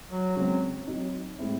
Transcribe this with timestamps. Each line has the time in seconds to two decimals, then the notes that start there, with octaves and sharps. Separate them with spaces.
0.11 F#3
0.36 C#3 F#3 G#3 C4
0.87 F#3 C4 D#4
1.39 A2 G#3 C4 E4